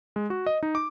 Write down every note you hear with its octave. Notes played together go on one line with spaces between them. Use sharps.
G#3
F#4
D#5
D#4
D6